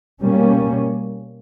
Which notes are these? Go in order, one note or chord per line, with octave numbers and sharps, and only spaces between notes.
B2 G3 A#3 C#4